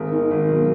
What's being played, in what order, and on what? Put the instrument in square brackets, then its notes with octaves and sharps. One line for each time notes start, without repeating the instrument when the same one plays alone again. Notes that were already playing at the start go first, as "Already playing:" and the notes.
Already playing: [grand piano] G#1 [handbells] G#4 A#4
[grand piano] D#3
G#1
B1